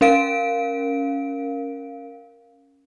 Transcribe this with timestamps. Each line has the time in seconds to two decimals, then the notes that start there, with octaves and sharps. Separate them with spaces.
0.01 C#4 A#4 F5 D7